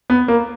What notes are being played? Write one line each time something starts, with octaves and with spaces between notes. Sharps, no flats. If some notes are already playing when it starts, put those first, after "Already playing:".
B3
A#3